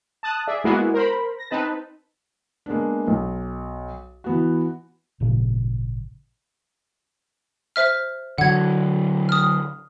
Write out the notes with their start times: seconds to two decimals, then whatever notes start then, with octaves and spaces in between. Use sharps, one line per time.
0.23 A5 D#6 F#6
0.47 G#4 D5 E5
0.64 G#3 A#3 B3 E4 F#4 G#4
0.94 A#4 C5 B5
1.39 A#6
1.50 C4 D#4 B4 A5
2.66 G#3 A#3 B3 D4
3.08 B1
4.24 E3 B3 F#4
5.20 G#1 A#2 C#3 F3
7.76 C5 E5 F6
8.38 D3 F#3 F#5 G#6
9.29 D#6 F6